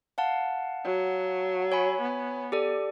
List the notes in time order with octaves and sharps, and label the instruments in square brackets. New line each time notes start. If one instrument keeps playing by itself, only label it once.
[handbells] F5 F#5 A5
[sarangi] F#3
[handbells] C#5 G#5 B5
[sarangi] B3
[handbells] G4 A4 D5